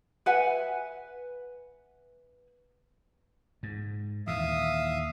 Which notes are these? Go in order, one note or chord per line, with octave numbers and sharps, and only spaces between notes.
B4 E5 F#5 G#5
G#2
D#2 A#2 E3 E5 F5 D#6